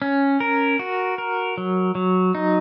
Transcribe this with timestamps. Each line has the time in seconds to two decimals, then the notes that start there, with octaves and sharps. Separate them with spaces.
0.02 C#4
0.40 A#4
0.79 F#4
1.18 A#4
1.58 F#3
1.95 F#3
2.35 D#4